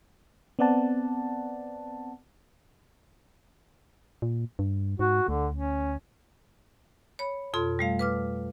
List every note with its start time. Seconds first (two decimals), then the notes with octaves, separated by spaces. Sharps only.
0.59 B3 C4 D5 F#5 A5
4.22 A#2
4.59 G2
4.99 G#2 F#4
5.29 D2 D3
5.53 C#4
7.19 C#5 B5
7.54 F2 B2 F4 A4 C6
7.79 G3 A3 F5
7.99 B4 D6 F6